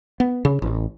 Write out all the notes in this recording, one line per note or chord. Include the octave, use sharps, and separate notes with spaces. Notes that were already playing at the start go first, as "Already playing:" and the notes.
B3
C#3
A1